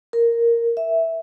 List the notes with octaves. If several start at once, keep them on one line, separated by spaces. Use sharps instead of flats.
A#4
E5